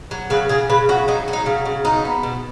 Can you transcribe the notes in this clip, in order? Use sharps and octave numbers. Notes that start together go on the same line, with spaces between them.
F#3
C#3 B4
C#3 G#4
C#3 B4
F#3 F#4
F#3 D#4
F#3
D#4
C#3
C#3
F#3 D#4
B3
B2